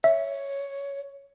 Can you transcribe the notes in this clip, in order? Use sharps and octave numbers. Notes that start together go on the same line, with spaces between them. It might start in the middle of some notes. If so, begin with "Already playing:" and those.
C#5 E5